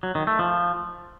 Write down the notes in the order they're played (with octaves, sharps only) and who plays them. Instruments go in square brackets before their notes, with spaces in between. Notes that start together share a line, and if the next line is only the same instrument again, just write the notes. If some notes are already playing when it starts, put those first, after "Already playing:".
[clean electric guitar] F#3
D#3
A3
F3